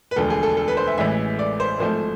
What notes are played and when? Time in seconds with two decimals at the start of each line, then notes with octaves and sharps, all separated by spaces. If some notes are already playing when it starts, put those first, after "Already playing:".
0.11 B4
0.16 E1 D2 D3 F3 A4
0.30 G#4
0.43 A4
0.57 A4
0.68 B4
0.77 C5
0.87 E5
0.98 A1 A2 E3 G#3 E5
1.39 D5
1.60 C5
1.79 G#1 G#2 F3 A3 C5